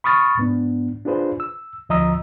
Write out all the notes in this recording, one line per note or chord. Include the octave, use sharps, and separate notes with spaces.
B5 C#6 D#6 F6 A6
G#2 B3 D4
D4 F4 G#4 B4 C5
E6
D2 F3 D#5 A#5 D#6 E6